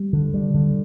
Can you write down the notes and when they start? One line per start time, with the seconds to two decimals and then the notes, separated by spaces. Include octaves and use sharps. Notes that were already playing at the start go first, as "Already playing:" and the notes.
Already playing: G3
0.13 D3
0.34 G3
0.54 D3